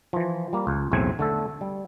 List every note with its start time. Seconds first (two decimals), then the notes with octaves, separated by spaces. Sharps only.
0.13 E3 F3
0.53 G3 A#3
0.67 C#2
0.92 B1 E2 A2 A3 C4 G#5
1.19 D3 A3 A4
1.61 G3